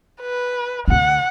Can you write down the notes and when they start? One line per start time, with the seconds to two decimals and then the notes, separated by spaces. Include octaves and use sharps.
0.21 B4
0.88 D2 D3 F#5